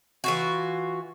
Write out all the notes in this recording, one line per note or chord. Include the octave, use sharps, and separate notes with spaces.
E3 F4 F#4